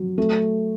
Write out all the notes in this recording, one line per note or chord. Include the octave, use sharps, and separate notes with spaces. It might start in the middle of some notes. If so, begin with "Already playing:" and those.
Already playing: F#3
A3